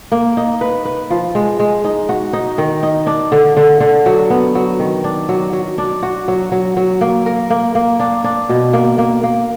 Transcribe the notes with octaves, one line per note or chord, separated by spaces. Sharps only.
A#3
D#4
B4
B4
F3
G#3
G#3
D#4
F#4
D#4
D#3
D#4
D4
D3
D3
D3
F#3
B3
F#3
D#3
D4
F#3
F#3
D4
F#4
F#3
F#3
F#3
A#3
A#4
A#3
A#3
D4
D4
B2
A#3
A#3
A#3